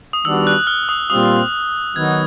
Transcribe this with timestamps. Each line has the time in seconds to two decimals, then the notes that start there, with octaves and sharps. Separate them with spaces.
0.13 D#6
0.25 D#3 G3 B3 D4 F#4 E6
0.47 F#6
0.67 F6
0.89 D#6
1.10 A#2 G3 C4 F4 D#6
1.95 D#3 F#3 B3 D#4 F#4 G#6